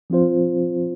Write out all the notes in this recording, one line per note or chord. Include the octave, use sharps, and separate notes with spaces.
F3 C4 F4 C5